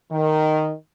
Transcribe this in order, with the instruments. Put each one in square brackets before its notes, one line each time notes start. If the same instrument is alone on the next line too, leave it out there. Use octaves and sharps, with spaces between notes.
[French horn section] D#3